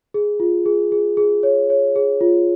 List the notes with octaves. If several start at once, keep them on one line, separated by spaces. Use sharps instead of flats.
G#4
F4
G#4
G#4
G#4
C#5
C#5
G#4
F4